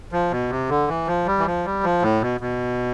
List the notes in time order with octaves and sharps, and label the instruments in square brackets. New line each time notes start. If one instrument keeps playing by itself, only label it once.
[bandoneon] F3
B2
C3
D3
E3
F3
G3
E3
F3
G3
F3
A2
B2
B2